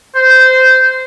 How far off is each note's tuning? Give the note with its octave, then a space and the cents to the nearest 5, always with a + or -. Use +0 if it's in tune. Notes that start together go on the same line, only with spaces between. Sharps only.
C5 -15